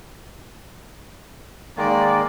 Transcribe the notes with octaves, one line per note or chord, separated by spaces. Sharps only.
D#3 G#3 A#3 D5